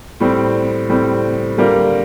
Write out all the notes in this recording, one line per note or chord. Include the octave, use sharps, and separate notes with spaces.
A2 G3 C4
A2 G3 C4
D3 G3 A#3 F4 A#4